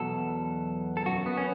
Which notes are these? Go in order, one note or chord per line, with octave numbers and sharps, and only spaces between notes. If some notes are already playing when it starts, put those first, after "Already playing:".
Already playing: E2 B2 F#3 A4
A4
F#2 F#3 F#4
B3
C#4